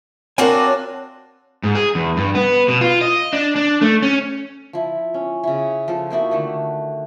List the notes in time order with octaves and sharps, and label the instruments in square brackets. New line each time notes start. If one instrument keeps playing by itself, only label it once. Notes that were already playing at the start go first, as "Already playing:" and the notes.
[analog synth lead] C4 [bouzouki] D4 F4 F#4 [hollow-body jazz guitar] A#4 G#5 [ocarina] C#5
[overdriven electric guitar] G#2
G#4
E2
G2
B3
B2
F4
D#5
D4
D4
A3
C#4
[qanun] F3 E4
C#4
C#3 E4
F3 A4
A#3 D#4 E4 F#4
D3 D#3 A3